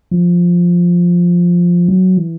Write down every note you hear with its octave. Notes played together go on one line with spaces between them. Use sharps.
F3
F#3
E3